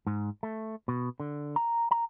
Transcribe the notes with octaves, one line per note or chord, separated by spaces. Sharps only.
G#2
A3
B2
D3
A#5
A#5